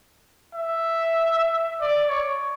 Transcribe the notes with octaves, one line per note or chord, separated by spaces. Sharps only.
E5
D5
C#5